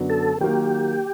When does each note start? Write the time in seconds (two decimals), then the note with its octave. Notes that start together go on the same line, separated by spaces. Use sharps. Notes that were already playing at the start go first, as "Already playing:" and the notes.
Already playing: F#2 D3 F#3 B3
0.10 A4
0.40 D#3 F#3 A#3 G4